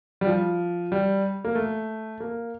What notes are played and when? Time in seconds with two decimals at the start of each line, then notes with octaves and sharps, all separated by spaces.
0.21 G3
0.27 F3
0.92 G3
1.44 A#3
1.55 A3
2.20 A#3